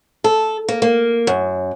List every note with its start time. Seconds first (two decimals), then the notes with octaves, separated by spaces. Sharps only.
0.24 A4
0.68 A#3
0.82 A#3
1.27 F#2